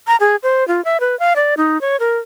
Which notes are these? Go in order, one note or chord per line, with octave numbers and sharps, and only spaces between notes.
A#5
G#4
C5
F4
E5
B4
F5
D5
D#4
C#5
A#4